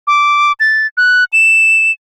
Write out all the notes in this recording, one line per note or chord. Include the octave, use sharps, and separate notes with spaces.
D6
A6
F#6
E7